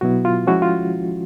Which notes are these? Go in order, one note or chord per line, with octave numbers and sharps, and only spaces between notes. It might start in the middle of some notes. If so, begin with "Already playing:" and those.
B2 F#3 B3 E4 F#4
F4
F3 G#3 C#4 E4 F#4
F4